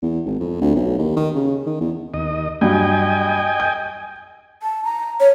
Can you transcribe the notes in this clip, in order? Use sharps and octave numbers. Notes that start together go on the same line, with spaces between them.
E2
G#1
F2
D2
B1
D#2
D#3
C#3
D#3
E2
D#2 D#5
G2 F#3 D#5 G5 G#5
G6
A5
A#5
C#5